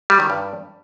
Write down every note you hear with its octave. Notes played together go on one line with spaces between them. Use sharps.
G3
D#3
G2